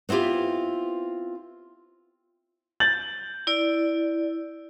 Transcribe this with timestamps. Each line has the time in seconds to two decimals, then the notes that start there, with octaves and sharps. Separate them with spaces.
0.09 B3 C4 E4 F4 G4
2.80 G6 A6 F#7
3.47 E4 D5